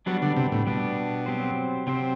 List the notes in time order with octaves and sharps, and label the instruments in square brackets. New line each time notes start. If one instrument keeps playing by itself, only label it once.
[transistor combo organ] F#3 [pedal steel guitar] G3 B3 D4
[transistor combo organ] D3
C3
A2
[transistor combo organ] B2 [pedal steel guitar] G3 B3 D4
[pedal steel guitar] F#3 C4 G4 C5
[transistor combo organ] C3 [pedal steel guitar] F#3 C4 G4 C5